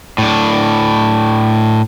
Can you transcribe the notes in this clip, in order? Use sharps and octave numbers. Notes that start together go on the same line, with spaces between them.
A2 D4